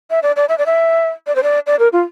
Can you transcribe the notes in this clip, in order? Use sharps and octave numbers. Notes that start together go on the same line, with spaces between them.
E5
D5
D5
E5
D5
E5
D5
C5
D5
D5
A#4
F4